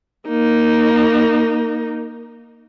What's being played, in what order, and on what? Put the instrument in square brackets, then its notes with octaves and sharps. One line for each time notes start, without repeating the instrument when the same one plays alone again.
[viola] A#3 D#4